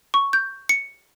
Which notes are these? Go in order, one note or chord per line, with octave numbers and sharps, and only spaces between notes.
C#6
G6
C#7